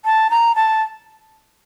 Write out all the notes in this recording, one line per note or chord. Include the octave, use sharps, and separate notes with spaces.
A5
A#5
A5